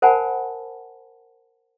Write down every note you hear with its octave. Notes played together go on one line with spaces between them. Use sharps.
A#4 C5 F#5 G#5 A5 B5